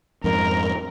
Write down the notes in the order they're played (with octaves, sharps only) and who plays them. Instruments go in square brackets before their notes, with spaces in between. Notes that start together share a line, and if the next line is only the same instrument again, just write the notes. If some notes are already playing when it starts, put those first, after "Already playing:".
[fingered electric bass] F2 G#2 [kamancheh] A#4